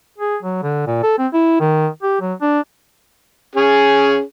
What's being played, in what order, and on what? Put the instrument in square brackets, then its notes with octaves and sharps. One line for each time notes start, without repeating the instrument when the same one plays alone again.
[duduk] G#4
F#3
D3
A#2
A4
C4
E4
D#3
G4
F#3
D4
[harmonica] C#4 G#4